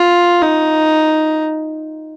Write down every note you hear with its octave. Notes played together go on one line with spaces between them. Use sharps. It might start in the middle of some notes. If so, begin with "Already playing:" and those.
Already playing: F4
D#4